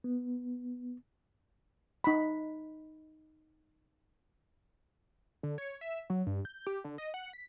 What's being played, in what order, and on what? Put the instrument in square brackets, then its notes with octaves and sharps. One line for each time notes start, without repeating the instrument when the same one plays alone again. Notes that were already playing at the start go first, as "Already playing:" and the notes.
[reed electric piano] B3
[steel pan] D#4 B5
[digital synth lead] D3
C#5
E5
F#3
G2
G6
G4
D3
D#5
F#5
B6